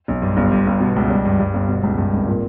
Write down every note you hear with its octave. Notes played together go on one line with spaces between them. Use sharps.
B1
G2
G1
G2
G1
B2
C#2
G3
G2
G2
G1
B2
C#2
G2
G#1
A#2